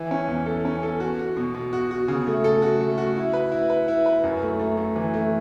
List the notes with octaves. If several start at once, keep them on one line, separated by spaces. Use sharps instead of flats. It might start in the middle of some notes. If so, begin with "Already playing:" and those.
Already playing: E3
C#4
E2
A4
C#4
A4
F#4
F#4
B2
B2
F#4
F#4
C#3
A3
A4
F#4
A3
F#4
E4
B4
E4
B4
E4
B4
F#2
A3
A3
A3
E3
A3